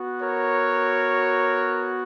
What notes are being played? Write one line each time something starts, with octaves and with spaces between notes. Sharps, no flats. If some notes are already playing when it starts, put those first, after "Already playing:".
Already playing: B3 F#4
A#4 C#5